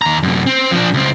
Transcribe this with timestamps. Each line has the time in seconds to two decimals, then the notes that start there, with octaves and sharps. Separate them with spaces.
0.02 D#2 A#5
0.23 F#2 C3
0.47 C4
0.71 F3 D4
0.94 C#2 C4